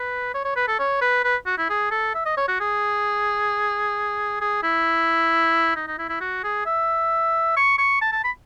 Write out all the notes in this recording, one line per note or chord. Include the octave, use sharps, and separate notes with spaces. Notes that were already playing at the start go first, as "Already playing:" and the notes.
Already playing: B4
C#5
C#5
B4
A4
C#5
B4
B4
F#4
E4
G#4
A4
E5
D#5
C#5
F#4
G#4
G#4
E4
D#4
D#4
E4
E4
F#4
G#4
E5
C#6
C#6
A5
A5
B5